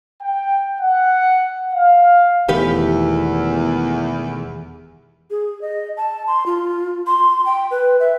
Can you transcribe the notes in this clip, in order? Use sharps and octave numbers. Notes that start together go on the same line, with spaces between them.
G5
F#5
F5
E1 E2 D#3 A3 G4 B4
G#4
D#5
A5
C6
F4
C6
G5
B4
E5